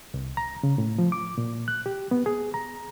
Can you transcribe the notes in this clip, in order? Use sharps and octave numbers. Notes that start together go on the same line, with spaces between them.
C2
A#5
C#3
A2
F3
D6
A#2
F#6
G4
B3
G#4
A#5